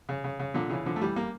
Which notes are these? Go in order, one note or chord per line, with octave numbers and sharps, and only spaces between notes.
C#3
C#3
C#3
A#2 D3
C#3 E3
D3 F3
A3
E3 G3
G3 A#3